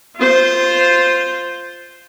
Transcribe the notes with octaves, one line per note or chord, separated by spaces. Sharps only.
F4 C5